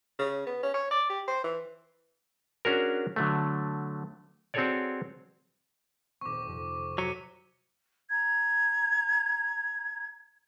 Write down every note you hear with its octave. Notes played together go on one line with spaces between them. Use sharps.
C#3
B3
C#4
C#5
D5
G4
C5
E3
C#4 D4 F#4 G#4 A#4
D3 F#3 A3
C4 F#4 G#4 A4 C#5 D5
D#1 C4 C#6 D6
F2 C3
F#3 B6 C#7 D#7
A#5 G#6